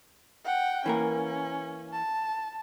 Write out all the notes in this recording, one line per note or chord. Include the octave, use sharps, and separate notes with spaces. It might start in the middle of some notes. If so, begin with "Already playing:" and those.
F#5 G5
E3 A#3 C#4 A#4
A5